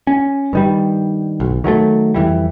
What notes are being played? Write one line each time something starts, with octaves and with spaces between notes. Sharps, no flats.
C#4
G2 D#3 G3
B1
D#3 F#3 G#3 A3
F2 E3 G3